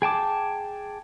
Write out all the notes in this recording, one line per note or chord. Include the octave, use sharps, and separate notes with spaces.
G#4 G5 A5 D6